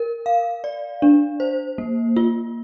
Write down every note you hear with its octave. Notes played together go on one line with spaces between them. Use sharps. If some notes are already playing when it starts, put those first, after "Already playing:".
Already playing: A#4
F5
D5
D4
C5
A#3
F4